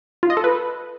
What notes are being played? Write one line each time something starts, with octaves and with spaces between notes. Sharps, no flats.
F4
D#5
A4
B4